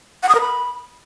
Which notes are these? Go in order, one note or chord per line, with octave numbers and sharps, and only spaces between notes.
F#5
D#6
A#4
B5